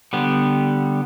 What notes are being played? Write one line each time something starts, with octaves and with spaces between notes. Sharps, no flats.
D3 G3 B3